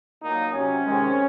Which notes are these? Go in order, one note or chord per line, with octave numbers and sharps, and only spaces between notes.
A#2 F#3 A#3 D#4
C3 F#3 C4 C#4
F2 C3 D#3 G#3 C4